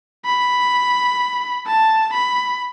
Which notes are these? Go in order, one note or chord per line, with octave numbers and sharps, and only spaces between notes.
B5
A5
B5